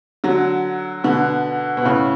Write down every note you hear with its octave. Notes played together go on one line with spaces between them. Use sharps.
D3 F#3
B2 D3
B2
A2 C#3